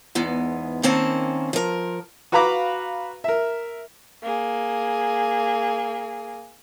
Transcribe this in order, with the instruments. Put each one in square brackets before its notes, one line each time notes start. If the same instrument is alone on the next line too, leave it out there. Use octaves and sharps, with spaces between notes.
[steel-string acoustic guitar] E2 G#2 B3
D#3 A#3 C4 C#4 A5
F3 A#4
[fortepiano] F#4 B4 F5 A#5 B5 D6
A#4 E5
[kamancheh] A#3 G#4